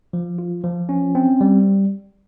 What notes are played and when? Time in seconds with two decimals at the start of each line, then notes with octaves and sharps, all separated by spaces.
0.13 F3
0.39 F4
0.64 F3
0.89 C#4
1.15 C4
1.41 G3